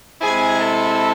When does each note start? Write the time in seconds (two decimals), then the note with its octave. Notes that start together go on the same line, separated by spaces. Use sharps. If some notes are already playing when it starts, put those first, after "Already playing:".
0.21 C3 G#3 C4 E4 G#4 G#5
0.60 A4 A5